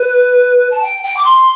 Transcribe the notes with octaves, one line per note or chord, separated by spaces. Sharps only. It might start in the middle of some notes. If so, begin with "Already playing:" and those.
Already playing: B4
A5
G5
G5
D6
C6